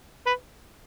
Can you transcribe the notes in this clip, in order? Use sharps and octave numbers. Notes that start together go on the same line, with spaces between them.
B4